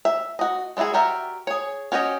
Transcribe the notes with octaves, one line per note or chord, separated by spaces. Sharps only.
E5
F#4 D#5
G#3 D4 E4 F#4 G#4
F#4 G4 A#4 D5 E5
G#4 C#5
C#4 F#4 G4 C#5 D#5